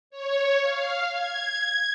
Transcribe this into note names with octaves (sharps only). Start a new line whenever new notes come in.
C#5
F5
G#6